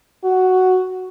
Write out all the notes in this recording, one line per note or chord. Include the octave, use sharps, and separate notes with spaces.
F#4